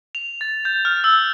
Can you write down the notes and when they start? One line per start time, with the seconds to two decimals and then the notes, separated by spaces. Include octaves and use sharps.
0.15 F7
0.41 A6
0.65 G6
0.85 F6
1.04 E6